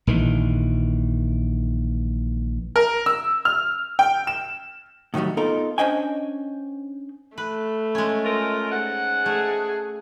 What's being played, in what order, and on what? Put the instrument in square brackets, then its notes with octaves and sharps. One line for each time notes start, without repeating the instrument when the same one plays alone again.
[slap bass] A#1 D#3 E3
[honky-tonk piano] A#4
E6
F6
G5
E7
[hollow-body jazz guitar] A2 D#3 E3 F#3 G3
B3 D#4 F4 A4 A#4
C#4 D4 C5 D#5 G5 G#5
[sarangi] A3 [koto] B4
[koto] G#3 C#4
[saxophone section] F4 A#4
G#2 F#5
[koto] A3 [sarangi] G#4